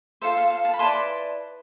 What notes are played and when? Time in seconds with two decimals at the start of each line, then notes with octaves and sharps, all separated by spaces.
0.22 F4 A4 C5 E5
0.37 F5
0.50 F5
0.65 F5 A5
0.74 B5
0.79 E4 B4 D5 A5 C6